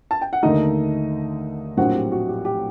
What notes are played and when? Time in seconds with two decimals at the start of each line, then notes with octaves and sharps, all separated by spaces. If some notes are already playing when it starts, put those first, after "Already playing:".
0.11 A5
0.21 G5
0.33 F#5
0.43 D#2 D3 A3 D#4 D#5
1.77 A#1 A2 F#3 C4 F#4 F#5
1.95 G4
2.12 F#4
2.28 G4
2.45 G4